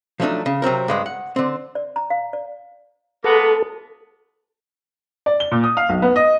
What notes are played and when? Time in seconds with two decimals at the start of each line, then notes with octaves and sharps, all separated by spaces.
0.20 F3 F#3 A3 C4 D4 D#4
0.46 C#3
0.62 C3 F#3 C4 A#4
0.88 G2 G#3 B3
1.06 F#5
1.36 D3 C4
1.75 D5
1.96 A#5
2.10 F5
2.33 D5
3.24 G#3 A#3 B3 A4
5.26 D5
5.40 G7
5.51 A#2
5.64 D#6
5.77 F5
5.89 B1
6.02 B3
6.16 D#5